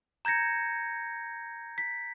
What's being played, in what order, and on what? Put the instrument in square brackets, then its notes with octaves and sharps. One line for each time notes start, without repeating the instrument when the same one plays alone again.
[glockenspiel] A#5 G6 G#6 A#6 C#7
B6